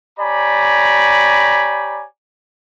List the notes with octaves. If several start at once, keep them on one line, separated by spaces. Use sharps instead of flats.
G4 C#5 D5 G#5 A#5 B5